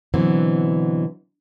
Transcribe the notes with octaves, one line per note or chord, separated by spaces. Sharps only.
B2 D3 E3 F#3 C4